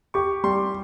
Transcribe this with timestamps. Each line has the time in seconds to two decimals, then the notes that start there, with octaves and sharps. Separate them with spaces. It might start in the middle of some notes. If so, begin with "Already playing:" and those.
0.14 G4 C#6
0.44 G3 C6